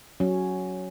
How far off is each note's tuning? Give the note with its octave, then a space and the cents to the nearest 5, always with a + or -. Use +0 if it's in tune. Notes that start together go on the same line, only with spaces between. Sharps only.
F#3 +0 C#4 +0